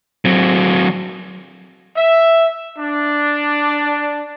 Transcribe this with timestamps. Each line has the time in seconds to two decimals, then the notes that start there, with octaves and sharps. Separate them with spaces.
0.25 F#3 C4
1.97 E5
2.78 D4